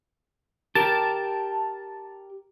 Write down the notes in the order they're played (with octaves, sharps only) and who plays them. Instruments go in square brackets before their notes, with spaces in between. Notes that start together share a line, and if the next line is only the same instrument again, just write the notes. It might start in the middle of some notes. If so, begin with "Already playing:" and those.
[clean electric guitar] G4 A#4 [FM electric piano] A5